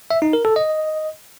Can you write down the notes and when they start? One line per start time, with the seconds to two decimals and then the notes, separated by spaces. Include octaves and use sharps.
0.11 E5
0.22 D#4
0.33 A#4
0.45 A4
0.56 D#5